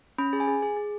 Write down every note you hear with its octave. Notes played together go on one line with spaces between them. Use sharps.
C#4 B5
G#4
G#5
G#4
G#4
G#4